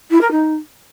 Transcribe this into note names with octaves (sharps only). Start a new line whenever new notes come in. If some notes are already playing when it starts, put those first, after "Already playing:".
E4
A#4
D#4